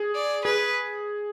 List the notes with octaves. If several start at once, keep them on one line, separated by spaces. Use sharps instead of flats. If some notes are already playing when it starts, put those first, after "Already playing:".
Already playing: G#4
D5
G#4 B4